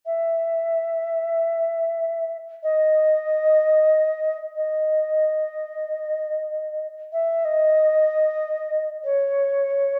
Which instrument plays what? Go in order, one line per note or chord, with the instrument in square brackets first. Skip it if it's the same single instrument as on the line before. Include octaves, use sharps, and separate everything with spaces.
[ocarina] E5
D#5
D#5
E5
D#5
C#5